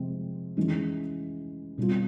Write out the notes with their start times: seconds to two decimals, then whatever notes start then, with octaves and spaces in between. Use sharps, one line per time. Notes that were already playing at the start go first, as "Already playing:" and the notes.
Already playing: C3 F3 G#3 C4
0.57 E3 G#3 C#4
1.78 B2 G3 C4 F4